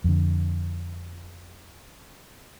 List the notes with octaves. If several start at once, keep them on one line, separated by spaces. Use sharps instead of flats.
F2 D3